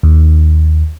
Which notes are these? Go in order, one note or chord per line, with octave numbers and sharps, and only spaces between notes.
D#2